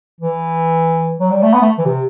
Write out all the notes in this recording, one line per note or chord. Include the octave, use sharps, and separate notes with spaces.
E3
F#3
G3
A3
B3
A3
E3
C3